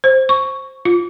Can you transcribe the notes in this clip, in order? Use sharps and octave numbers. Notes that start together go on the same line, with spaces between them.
C5
C#6
F4